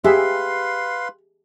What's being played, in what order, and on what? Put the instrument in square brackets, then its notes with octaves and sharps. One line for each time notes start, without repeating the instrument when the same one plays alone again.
[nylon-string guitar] G4 [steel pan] G#4 E5 [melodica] B4 F5 C6